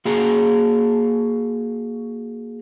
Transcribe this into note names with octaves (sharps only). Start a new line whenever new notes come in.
A#3 F#4 G#4 A#5